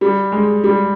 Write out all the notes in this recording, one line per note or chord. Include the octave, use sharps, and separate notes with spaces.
G3
G#3
G3